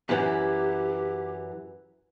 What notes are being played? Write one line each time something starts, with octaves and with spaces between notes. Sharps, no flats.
F#2 E3 G4